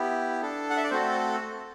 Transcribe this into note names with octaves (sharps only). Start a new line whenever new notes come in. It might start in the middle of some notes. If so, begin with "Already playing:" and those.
Already playing: B3 E4 G4
D4 A4
F#5
E5
D5
A3 C4 F#4 A4 C5